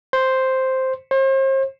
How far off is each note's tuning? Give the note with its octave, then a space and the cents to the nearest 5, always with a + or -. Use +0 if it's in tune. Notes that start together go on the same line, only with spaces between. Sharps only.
C5 +0
C5 +40